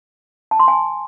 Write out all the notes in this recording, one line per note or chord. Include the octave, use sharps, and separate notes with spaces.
A5
C6
G#5